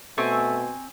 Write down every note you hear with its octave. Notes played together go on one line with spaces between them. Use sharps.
B2 A3 C4 G#5 C#6